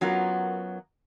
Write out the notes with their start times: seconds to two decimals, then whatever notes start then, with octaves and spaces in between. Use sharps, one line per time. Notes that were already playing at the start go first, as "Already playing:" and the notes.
0.01 F#2 F#3 B3 F4 A#4